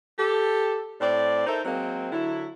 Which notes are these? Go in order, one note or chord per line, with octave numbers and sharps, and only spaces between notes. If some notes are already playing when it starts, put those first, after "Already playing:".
G4 A4
A2 C4 D5
D#4 A4 A#4 C5 E5
F#3 G#3 A#3 C4
D3 F#3 E4